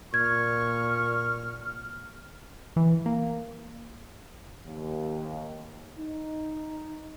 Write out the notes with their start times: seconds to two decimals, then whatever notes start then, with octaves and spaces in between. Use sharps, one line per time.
0.14 A#2 C#6 F6 G#6
2.76 E3
3.06 A#3
4.66 D#2
5.99 D#4